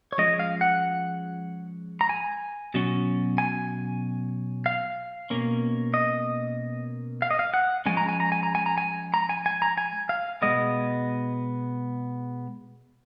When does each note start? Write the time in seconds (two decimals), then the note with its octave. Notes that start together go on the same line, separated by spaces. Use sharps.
0.13 C#5
0.18 F3 G#3 C#4 D#5
0.39 F5
0.61 F#5
2.01 A#5
2.09 G#5
2.74 B2 F#3 C#4
3.38 G#5
4.66 F5
5.30 B2 A#3 C#4
5.94 D#5
7.22 F5
7.31 D#5
7.39 F5
7.54 F#5
7.86 F3 G#3 C#4 G#5
7.97 A#5
8.09 G#5
8.20 A#5
8.32 G#5
8.43 A#5
8.55 G#5
8.66 A#5
8.78 G#5
9.14 A#5
9.29 G#5
9.46 G#5
9.62 A#5
9.77 G#5
10.09 F5
10.42 B2 G#3 B3 D#5